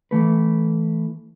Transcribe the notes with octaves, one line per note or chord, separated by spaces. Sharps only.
E3 A3 B4